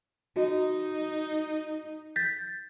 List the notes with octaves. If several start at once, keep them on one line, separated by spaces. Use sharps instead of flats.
D#4 F#4 D#5
G6 A6 B6